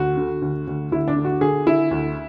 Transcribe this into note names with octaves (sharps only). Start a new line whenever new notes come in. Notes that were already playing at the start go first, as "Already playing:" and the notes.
Already playing: D2 F#4
D3
D2
D2
D2 E4
D4
D3
F#4
D3 G#4
D3 E4
D2